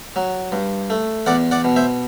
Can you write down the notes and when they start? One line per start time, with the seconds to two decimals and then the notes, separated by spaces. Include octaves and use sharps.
0.16 F#3
0.52 G2
0.90 A3
1.26 E2 D5 F#5
1.51 D5 F#5
1.64 B2
1.76 C5 E5